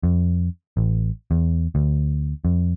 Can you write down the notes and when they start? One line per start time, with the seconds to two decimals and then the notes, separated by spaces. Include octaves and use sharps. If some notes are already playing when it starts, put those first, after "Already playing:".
0.03 F2
0.77 A1
1.31 E2
1.75 D2
2.45 F2